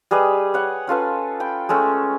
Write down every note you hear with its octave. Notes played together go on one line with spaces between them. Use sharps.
G3 G#4 B4 D#5
C#5 F#5
C#4 F4 A4 B4
G5 B5
G#3 A3 C#4 A4